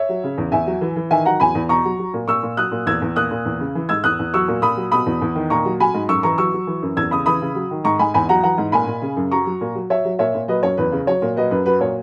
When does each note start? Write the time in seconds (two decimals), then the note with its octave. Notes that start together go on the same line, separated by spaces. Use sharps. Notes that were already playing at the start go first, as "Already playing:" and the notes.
Already playing: C#5 E5
0.09 F#3
0.24 C#3
0.38 E2
0.52 E2 E5 G#5
0.67 F#3
0.81 E3
0.96 E3
1.11 D#3 E5 G#5
1.25 F#3 F#5 A#5
1.40 E2 G#5 B5
1.55 E2
1.69 B2 A#5 C#6
1.85 F#3
1.99 F#3
2.13 A#2
2.28 A#2 C#6 E6
2.43 A#2
2.57 F#3 D#6 F#6
2.72 A#2
2.86 E2 E6 G#6
3.02 E2
3.16 A#2 D#6 F#6
3.31 A#2
3.45 E2
3.60 C#3
3.75 E3
3.89 G#2 E6 G#6
4.04 E2 D#6 F#6
4.19 E2
4.34 F#3 C#6 E6
4.48 A#2
4.62 A#2 B5 D#6
4.77 F#3
4.92 B2 B5 D#6
5.06 E2
5.22 E2
5.35 D#3
5.50 A#2 A#5 C#6
5.65 F#3
5.80 F#3 G#5 B5
5.94 G#2
6.09 F#2 C#6 E6
6.23 E3 A#5 C#6
6.38 F#3 C#6 E6
6.53 F#3
6.67 E3
6.82 F#2
6.97 E2 E6 G#6
7.11 C#3 B5 D#6
7.26 E3 B5 D#6
7.42 C#3
7.55 F#3
7.71 D#3
7.84 G#2 A#5 C#6
7.99 G#2 G#5 B5
8.14 E2 G#5 B5
8.29 F#3 F#5 A#5
8.43 E3 F#5 A#5
8.58 G#2
8.72 A#2 G#5 B5
8.87 A#2
9.02 C#3
9.17 F#2
9.31 F#3 A#5 C#6
9.46 F#3
9.61 A#2
9.75 F#3
9.90 F#3 C#5 E5
10.05 F#3
10.19 A#2 C#5 E5
10.35 A#2
10.48 F#3 B4 D#5
10.63 F#2 C#5
10.77 E2 B4
10.92 C#3
11.07 F#3 C#5
11.22 A#2
11.36 F#3 B4 D#5
11.51 F#2 B4
11.66 F#3 B4
11.80 A#2 C#5